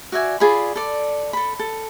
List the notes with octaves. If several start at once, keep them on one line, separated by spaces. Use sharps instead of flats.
F#4 D5 E5 G#5
F4 G#4 D5 B5
A4 D5
A4 B5
A4